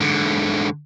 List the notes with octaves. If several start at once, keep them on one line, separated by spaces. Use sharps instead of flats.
G#2 D3